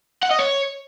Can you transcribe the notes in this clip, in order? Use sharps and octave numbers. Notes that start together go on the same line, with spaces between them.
F#5
D#5
C#5